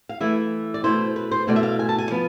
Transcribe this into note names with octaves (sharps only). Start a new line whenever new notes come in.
F5
E3 A3 E4 E5
D5
B2 A3 E4 C5
B4
C5
B2 A3 E4 D5
E5
F5
G#5
A5
G#5
F3 B3